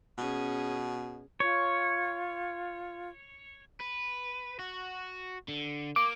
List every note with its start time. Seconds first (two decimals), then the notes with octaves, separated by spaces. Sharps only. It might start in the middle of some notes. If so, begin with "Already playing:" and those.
0.18 B2 C#4 G#4
1.40 F4 C#5
3.80 B4
4.59 F#4
5.48 D3
5.96 A#3 D6